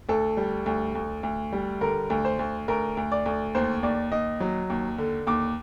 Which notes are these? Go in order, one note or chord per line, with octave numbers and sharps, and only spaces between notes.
D2 A4
G3
D2
D2
D2
G3
D3 A#4
D2
C5
D2
D2 A#4
D2
D5
D2
D#2 C5
D#2 D5
D#2 D#5
F#3
D#2
D3
D#2 D6